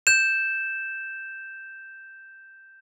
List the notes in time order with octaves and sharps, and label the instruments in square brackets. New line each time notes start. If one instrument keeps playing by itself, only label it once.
[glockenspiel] G6 E7